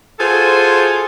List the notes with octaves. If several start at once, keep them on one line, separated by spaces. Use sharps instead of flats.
F4 F#4 G#4 A4 C5